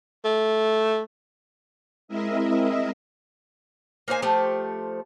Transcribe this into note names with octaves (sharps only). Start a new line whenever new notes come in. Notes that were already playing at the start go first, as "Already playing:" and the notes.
A3
G#3 C4 E4 A#4 D#5 E5
A#3 D#4 C5 G#5
F3 A3 G4 C5